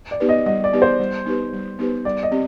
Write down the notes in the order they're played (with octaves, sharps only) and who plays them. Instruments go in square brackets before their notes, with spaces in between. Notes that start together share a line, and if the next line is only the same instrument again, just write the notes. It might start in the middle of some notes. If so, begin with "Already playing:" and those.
[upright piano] D5
[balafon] B3 D#4 G4 B4
[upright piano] D#5
[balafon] G3 [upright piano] D#5
[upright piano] D5
[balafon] B3 D#4 G4 B4
[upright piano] C5
[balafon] G3
B3 D#4 G4 B4
G3
B3 D#4 G4 B4
[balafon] G3 [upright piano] D5
[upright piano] D#5
[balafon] C4 G4